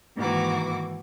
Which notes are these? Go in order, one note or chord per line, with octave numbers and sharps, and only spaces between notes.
G#2 D#3 E3 A#3 F#4 D6